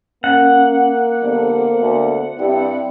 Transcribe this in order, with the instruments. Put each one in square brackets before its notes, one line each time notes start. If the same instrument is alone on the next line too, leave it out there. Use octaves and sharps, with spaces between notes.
[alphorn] A#3 [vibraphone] C#4 [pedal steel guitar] F#5
[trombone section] F2 D3 G3 [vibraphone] B3 C5
[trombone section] D2
[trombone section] G2 G3 [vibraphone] C4 D5 G5 [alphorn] E4